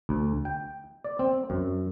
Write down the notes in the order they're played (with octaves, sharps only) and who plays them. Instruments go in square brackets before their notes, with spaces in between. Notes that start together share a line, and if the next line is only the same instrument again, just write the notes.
[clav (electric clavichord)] D2
G5
D5
C4
F#2